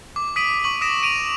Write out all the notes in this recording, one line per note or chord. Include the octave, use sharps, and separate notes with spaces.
D6
D#6 B6 D7 D#7 F#7
C#6 F#7
D#6 A#6 B6 D7 E7
D7 D#7 F7